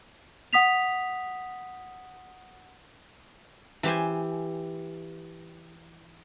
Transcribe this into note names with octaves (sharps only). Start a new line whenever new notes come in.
F#5 D#6 B6 F7
E3 G4 C5 G#5